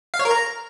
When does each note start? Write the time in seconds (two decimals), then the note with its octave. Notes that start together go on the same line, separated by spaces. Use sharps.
0.14 F5
0.19 C#5
0.25 A#4
0.31 A#5